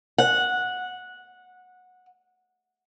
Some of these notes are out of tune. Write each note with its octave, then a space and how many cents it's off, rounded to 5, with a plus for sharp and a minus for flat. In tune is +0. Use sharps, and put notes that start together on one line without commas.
F#5 -15